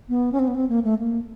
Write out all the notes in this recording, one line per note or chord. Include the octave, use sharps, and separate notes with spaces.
B3
C#4
C4
B3
C4
A#3
A3
A#3